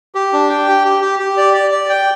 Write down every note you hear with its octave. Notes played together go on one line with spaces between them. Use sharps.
G4
D4
G5
G4
G4
G4
G4
D5
D5
D5
G5